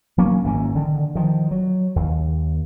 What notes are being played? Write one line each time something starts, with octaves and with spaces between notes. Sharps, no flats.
F#3 A#3 C#4
G#1 E3 A#3 C#4
D3 D#3
D#3 F3
F#3
D#2